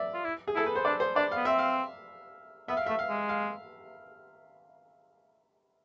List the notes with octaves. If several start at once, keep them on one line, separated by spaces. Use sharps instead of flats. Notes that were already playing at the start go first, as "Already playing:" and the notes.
Already playing: D5 E5
F4
E4
G#4
E4 A4
B4
C5
D4 D5
C5
D4 D5
B3 F5
C4 E5
F5
B3 E5
F5
A3 E5
F5
G#3
F5